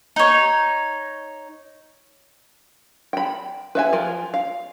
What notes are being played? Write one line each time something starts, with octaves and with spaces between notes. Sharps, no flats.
D#4 C#5
G5 B5
B4 E5 G#5
F3 F4 A#4 G#5
F5